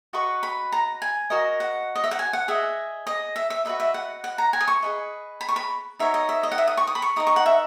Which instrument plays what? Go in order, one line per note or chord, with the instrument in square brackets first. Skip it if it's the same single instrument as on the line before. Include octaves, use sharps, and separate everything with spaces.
[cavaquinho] F#4 B4 D#5 C#6
B5
A#5
G#5
F#4 A#4 D#5
F#5
D#5
E5
F#5
G#5
F#5
G#4 D#5 E5
D#5
E5
E5
F#4 B4 D#5 E5
E5
F#5
F#5
A#5
G#5
D#6
C#6
G#4 B4 D#5
B5
C#6
B5
D#4 F#4 A#4 C#5 E5
D#5
E5
D#5
F#5
E5
D#6
C#6
D#6
B5
C#6
D#4 A#4 D#5 D#6
C#6
F#5
E5